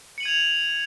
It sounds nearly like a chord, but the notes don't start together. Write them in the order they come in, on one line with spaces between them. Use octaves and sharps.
C#7 F#7 D#7 G#6 F7